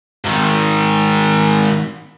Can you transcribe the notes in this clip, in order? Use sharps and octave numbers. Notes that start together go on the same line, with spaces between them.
G#2 D#3